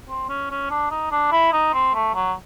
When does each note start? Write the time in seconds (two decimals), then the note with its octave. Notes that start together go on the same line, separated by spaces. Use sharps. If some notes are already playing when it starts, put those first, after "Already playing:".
0.09 C4
0.29 C#4
0.51 C#4
0.70 D4
0.91 D#4
1.12 D4
1.32 E4
1.53 D#4
1.74 C4
1.94 A3
2.15 F#3